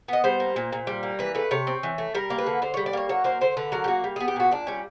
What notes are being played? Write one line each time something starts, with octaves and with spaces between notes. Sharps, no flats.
B3 D#5
G3 C5
A#3
A#2
A#2
G3
A#3
E3 B4
A3 B4
C3 C#5
C4
E3
A3
G3 A#4
A#3
B4
D3
D3 C5
G3 C#5
D5
A#3 C#5
F#3 C#5
A#3 C5
D3 C5
D3 B4
F#3 A#4
G4
A#3 F#4
G3
B3 G#4
G4
A#2 F#4
A#2 D4
G3 C#4